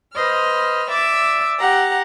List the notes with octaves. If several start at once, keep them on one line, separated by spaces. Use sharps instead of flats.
B4 C5 D#5 F6
D5 E5 D6 E6
G4 F#5 A#5